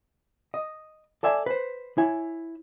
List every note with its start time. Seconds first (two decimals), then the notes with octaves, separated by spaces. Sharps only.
0.54 D#5
1.23 A4 D5 E5 G#5
1.46 B4 C5
1.98 E4 C#5 G#5